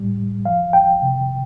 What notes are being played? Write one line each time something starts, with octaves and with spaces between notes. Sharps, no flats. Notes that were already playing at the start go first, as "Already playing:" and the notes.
Already playing: A2 G3
C2
F3 F5
G2 G5
C3